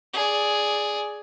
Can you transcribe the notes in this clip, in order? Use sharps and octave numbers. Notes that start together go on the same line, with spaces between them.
G#4 D5